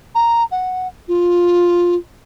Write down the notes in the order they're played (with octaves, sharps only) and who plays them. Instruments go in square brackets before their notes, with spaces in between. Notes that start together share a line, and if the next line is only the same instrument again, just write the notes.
[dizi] A#5
F#5
F4